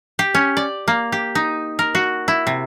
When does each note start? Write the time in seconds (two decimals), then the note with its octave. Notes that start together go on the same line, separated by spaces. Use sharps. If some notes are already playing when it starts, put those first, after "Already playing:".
0.19 G4
0.35 C#4
0.57 D5
0.88 A#3
1.12 G4
1.35 D#4
1.79 A#4
1.95 F#4
2.28 E4
2.47 C3